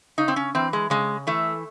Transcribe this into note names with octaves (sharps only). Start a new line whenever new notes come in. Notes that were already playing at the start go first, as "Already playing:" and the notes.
C#3 D#4
C4
C#4
E3 C4
G#3
C#3 G#3
E3 A3